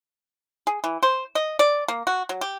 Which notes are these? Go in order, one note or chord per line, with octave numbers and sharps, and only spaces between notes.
G#4
E3
C5
D#5
D5
A#3
F#4
F#3
G4